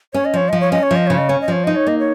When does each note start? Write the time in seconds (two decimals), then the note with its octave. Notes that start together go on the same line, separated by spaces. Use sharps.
0.14 C#4 C#5
0.25 D#5
0.34 F3 C#5
0.49 F3 D#5
0.61 C#5
0.72 C#4 D#5
0.83 C#5
0.91 F3
0.96 D#5
1.07 C#3 C#5
1.18 D#5
1.29 C#4 C#5
1.41 D#5
1.48 F3 C#5
1.64 D#4 D#5
1.76 C#5
1.87 A#3 D#5
1.99 C#5